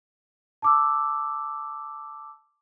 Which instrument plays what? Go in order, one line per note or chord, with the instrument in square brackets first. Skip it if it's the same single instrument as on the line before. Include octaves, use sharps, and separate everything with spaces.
[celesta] A5 D6 E6